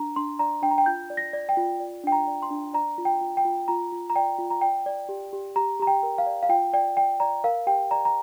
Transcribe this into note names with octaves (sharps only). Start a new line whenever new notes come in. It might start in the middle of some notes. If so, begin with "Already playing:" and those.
Already playing: D4 A#5
D4 C6
D5 A#5
D4 G5
A#5
G5
F4 G6
D5
A#6
D5
G5
F4
D5
D4 G5
A#5
D5
C6
D4
D5 A#5
F4
G5
F4
G5
F4
F4 A#5
F4
A#5
D5 G5
F4
A#5
D5 G5
D5
G4
G4
G4 A#5
G4 A#5
G5
A#4
F5
D5
F5
F4 G5
D5 G5
D5 G5
D5 A#5
A#4 F5
G4 G5
D5 A#5
A#5